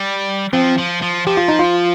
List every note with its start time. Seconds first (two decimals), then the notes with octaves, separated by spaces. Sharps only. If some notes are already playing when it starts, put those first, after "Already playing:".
Already playing: G3
0.53 F3 C4
0.78 F3
1.02 F3
1.27 F3 G4
1.37 F4
1.49 D#4
1.59 F4